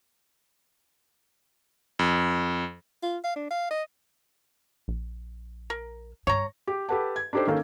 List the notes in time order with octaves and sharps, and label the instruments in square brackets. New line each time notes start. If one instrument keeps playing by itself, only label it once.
[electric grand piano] F2
[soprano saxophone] F4
F5
D4
F5
D#5
[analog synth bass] A#1
[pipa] A#4
[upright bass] G2 [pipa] C#5 A#5
[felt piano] G4
G4 A4 B4 F#5 A5
G#6
D4 D#4 G4 A4 C5
D#3 A#3 C#4 A4 F5